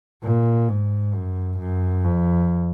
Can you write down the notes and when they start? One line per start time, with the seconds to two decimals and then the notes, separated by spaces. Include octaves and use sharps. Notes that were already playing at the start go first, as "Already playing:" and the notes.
0.24 A#2
0.68 G#2
1.14 F#2
1.59 F#2
2.04 F2